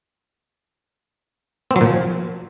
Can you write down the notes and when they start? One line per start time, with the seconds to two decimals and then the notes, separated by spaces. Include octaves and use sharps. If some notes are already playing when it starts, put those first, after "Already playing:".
1.71 C4
1.76 F#3
1.81 A#2
1.86 F3